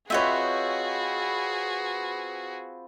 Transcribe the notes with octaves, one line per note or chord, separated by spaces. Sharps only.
C4 F4 F#4 G#4 B4 C#5 D#5 E5